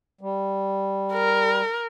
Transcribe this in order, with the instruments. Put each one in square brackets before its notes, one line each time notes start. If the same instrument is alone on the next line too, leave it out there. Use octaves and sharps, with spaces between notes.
[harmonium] G3
[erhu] A#4